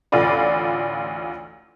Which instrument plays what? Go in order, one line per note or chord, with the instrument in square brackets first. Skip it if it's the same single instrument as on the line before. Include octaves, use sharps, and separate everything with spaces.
[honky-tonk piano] A1 D2 F4 D5 B5